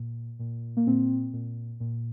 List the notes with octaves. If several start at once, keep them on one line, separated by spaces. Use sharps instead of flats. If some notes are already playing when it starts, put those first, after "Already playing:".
Already playing: A#2
A#2
A#3
A#2 C4
A#2
A#2